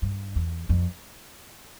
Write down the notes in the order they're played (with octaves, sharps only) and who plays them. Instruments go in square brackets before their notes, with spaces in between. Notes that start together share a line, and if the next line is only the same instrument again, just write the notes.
[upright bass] G2
E2
F2